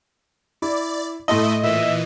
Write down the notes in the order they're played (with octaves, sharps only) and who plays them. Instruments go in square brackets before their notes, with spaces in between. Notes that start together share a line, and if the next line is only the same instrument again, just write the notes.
[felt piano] E4 [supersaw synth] D5
[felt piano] A2 C6 D#6 [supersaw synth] A3 E4 [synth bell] D#5
[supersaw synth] A#2 E3 [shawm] E5